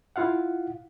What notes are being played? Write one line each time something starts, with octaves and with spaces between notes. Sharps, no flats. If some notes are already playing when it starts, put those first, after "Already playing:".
E4 F4 F5 F#5